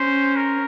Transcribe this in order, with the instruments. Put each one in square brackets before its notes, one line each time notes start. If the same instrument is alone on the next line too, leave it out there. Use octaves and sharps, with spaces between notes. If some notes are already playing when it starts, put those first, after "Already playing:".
Already playing: [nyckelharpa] C#4 [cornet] C5
[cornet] A#4